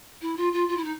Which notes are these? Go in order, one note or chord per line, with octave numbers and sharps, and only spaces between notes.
E4
F4
F4
F4
E4
D#4